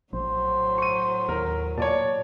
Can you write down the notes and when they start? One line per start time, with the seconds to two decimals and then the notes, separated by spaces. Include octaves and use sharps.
0.13 A#1 A2 F#3 C5
0.78 C#6 D#7
1.29 D#2 A#4
1.78 A#2 C#5 D5 A5